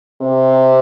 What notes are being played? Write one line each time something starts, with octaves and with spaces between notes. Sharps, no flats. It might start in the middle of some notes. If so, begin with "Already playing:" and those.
C3